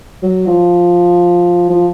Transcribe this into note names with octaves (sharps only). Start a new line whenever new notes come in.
F#3
F3
F3